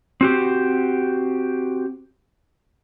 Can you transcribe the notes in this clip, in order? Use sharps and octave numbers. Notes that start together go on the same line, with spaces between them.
C4 F#4 G4